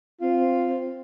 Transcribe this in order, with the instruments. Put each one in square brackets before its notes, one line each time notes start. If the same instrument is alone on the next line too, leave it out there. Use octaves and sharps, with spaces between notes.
[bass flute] C4 [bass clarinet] F4